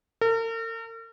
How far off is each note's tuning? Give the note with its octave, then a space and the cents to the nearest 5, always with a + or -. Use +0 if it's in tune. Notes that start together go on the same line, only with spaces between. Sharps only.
A#4 -45